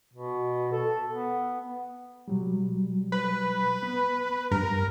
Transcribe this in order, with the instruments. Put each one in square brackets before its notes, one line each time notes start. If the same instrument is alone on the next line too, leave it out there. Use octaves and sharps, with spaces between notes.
[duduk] B2
A4
B3
[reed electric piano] B2 F#3 G3
[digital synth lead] B4
[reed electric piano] B3
[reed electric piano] G2 [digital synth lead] A#4